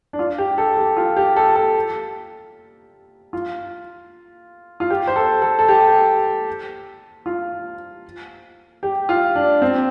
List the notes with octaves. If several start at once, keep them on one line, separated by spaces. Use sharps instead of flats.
D4
F4
G4
A4
G4
F4
G4
A4
A4
F4
F4
G4
C5
A4
A4
A4
G4
F4
G4
F4
D4
C4